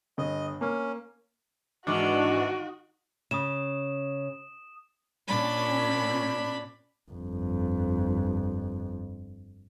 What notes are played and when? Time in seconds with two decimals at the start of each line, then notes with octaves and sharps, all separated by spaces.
0.18 G1 D#5
0.61 A#3 C#4
1.87 G#2 D#3 E3 D4 F#4 D#5 F#5 C#6
3.31 C#3 D#6 E7
5.28 A#2 C#4 D4 B5
7.12 G1 F2